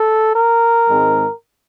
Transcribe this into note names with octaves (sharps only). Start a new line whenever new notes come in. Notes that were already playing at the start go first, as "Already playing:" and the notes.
Already playing: A4
A#4
G#2 D#3 G#3 C4